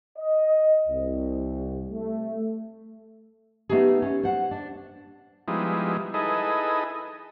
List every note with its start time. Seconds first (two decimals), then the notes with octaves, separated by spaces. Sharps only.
0.18 D#5
0.88 C2
1.92 A3
3.69 A3 B3 D#4 G4 G#4
4.02 C#4
4.23 C5 F#5
4.51 D4
5.48 F3 G3 G#3 B3 D#4 E4
6.14 D#4 E4 G#4 A4 B4 D#5